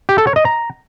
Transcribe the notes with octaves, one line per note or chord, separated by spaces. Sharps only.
G4
A4
C#5
D#5
A#5